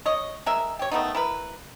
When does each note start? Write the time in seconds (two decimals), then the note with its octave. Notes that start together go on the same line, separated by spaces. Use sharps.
0.06 C#5 D#5
0.46 G#3 A#4 E5
0.79 G4 C#5
0.91 D#3 A3 B3 D#4
1.15 E4 A#4 B4